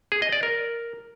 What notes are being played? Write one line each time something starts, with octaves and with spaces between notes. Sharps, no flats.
G#4
D#5
D5
A#4